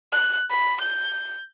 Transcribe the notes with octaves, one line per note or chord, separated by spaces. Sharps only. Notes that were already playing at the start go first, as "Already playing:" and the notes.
F#6
B5
G6